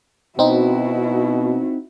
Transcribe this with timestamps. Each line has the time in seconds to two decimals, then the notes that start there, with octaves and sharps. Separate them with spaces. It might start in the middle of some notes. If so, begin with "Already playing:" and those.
0.39 B2 C4 D#4 E4 F#4